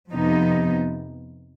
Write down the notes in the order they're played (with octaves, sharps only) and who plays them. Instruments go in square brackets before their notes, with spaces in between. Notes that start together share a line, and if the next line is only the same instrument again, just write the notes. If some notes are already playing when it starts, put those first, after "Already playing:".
[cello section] F2 C3 F3 B3 D#4